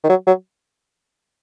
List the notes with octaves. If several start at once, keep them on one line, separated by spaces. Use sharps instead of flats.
D#3
F#3
F#3